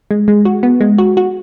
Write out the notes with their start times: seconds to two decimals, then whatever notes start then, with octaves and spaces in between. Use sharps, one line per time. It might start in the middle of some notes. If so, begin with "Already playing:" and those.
0.11 G#3
0.28 G#3
0.45 F#4
0.63 B3
0.81 G#3
0.98 F#4
1.17 F#4